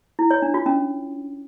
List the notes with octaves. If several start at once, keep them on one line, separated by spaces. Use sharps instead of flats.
E4
C#5
D4
F4
C#4